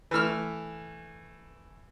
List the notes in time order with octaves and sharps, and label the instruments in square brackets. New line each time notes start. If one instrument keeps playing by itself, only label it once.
[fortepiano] E3 A3 E6 F6